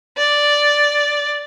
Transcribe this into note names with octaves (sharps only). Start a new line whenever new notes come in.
D5